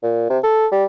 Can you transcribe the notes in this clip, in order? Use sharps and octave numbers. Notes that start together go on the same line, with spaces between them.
A#2
C3
A4
G3